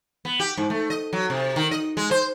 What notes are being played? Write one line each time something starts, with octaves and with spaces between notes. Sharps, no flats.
B3
G4
G#2
A3
D#5
F#3
C3
D#3
D#5
G#3
C5